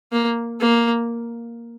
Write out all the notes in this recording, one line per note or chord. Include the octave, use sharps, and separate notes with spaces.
A#3
A#3